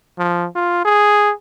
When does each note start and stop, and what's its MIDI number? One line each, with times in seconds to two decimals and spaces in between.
0.19 0.47 53
0.55 0.82 65
0.85 1.32 68